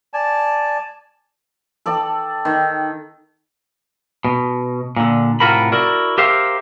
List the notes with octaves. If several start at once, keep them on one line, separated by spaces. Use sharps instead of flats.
D5 G#5 A5
A4 D5 G5 A5
D#3
B2
A#2 D3
A2 C3 F4 F#4 A#4 B5
E4 F#4 A#4 D5
G4 A#4 C5 E5 F5